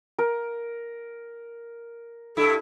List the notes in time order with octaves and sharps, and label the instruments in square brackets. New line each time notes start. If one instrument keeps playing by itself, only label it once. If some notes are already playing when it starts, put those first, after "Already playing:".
[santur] A#4
[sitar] G2 E4 [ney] A4